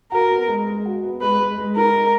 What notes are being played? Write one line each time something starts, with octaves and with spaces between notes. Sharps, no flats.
F#4 A#4
B3
G#3
G#3
F#4
B3
G#3 B4
G#3
G#3
D#4 A#4
G#3